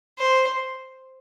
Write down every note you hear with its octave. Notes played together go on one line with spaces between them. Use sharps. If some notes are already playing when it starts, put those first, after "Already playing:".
C5